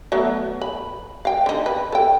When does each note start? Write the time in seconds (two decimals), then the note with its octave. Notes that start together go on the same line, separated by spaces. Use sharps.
0.12 F#3 A3 B3
0.62 B5
1.25 F5 G5
1.46 D3 D#4
1.66 B4
1.92 A4 G5